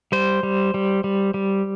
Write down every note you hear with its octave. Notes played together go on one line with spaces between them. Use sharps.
G3 C5
G3
G3
G3
G3